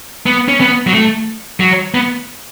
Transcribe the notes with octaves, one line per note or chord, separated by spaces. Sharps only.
B3
C#4
B3
F#3
A3
F#3
B3